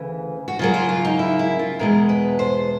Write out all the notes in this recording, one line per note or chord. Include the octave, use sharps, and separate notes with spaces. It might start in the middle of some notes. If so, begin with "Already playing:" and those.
Already playing: D2 C#3 E3
F#4
C#3 F#3 A#3 F4
F4
F4
D#4
E4
E4
F4
E2 B2 G#3 A#4
B4
C5